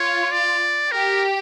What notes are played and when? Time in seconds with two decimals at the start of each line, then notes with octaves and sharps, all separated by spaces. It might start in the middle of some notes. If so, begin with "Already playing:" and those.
Already playing: F4 C#5
0.32 D5
0.92 G4 A#4